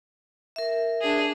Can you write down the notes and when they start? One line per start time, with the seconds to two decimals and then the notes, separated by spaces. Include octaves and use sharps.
0.56 A#4 E5
1.01 D4 G#4